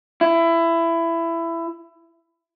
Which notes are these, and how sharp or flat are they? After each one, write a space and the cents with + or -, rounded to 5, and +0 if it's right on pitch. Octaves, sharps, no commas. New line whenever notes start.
E4 +20